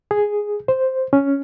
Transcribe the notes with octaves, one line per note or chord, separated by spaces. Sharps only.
G#4
C5
C#4